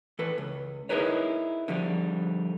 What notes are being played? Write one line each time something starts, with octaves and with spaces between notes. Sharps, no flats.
E3 A4 B4
C#2
D#4 E4 G#4 A#4 B4 C#5
D3 F3 G3